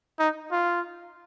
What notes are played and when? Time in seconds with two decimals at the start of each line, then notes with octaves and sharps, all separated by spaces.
0.19 D#4
0.52 F4